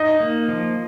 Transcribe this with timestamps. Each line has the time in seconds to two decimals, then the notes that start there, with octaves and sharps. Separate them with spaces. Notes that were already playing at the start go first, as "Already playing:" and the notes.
Already playing: D#4 D#5
0.20 A#3
0.48 F3